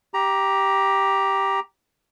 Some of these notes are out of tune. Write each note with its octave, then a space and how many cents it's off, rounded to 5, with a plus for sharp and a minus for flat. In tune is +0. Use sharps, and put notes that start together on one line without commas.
G4 +0 A#5 +15